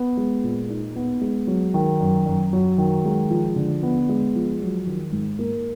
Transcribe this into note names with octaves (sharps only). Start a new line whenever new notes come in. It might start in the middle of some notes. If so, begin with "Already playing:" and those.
Already playing: B3
G#3
A#2
D#4
B3
G#3
F#3
D#3
F#2
F#2
F#3
D#3
G#3
F3
D3
B3
G#3
F3
F#3
D#3
G#2
A#3